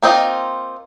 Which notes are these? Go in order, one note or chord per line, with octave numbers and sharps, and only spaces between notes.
A#3 C4 D#4 F4